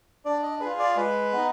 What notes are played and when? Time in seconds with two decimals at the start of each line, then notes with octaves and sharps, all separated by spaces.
0.25 D4 D5
0.43 D#5
0.60 F4 G#4 B4
0.79 D5
0.96 G#3 B4
1.33 B3 D#4